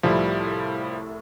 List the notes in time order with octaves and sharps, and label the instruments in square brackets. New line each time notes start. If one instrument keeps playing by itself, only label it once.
[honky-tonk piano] C2 A2 [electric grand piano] F3 G3 E4